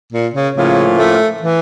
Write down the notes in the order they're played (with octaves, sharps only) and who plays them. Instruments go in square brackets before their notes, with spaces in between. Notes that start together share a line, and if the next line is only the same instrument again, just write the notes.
[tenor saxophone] A#2
C#3
[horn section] A2 F3 A#3 C#4 F4 [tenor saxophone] C#3
[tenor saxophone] A3
E3